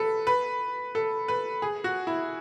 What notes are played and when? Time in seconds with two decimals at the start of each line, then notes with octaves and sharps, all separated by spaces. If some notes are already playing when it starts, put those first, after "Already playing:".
Already playing: A4 B4
0.27 B4
0.95 A4
1.28 B4
1.62 G#4
1.84 F#4
2.07 E4